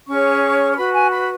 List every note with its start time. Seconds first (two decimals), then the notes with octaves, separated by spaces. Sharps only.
0.08 C#4 G#4 C#5 C#6
0.73 C#6
0.76 F#4 B4 B5
0.93 G#5
1.11 B5